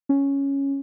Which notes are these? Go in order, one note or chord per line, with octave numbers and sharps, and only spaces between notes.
C#4